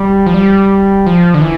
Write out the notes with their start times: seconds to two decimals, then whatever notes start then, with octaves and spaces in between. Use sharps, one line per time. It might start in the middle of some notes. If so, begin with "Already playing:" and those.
Already playing: G3
0.26 F3
0.34 G3
1.06 F3
1.34 D3
1.41 E3